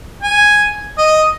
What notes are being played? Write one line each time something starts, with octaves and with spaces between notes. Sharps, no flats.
G#5
D#5